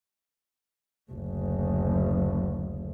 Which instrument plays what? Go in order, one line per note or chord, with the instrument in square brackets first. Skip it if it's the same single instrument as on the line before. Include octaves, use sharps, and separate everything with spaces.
[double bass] F#1 D2